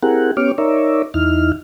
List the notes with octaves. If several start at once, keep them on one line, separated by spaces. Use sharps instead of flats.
C4 E4 G4 G#4 A#4 F#5
B3 C#4 G4 C#5 D6 F6
D#4 A#4 C#5 D5 E5
E2 D#4 E4 F6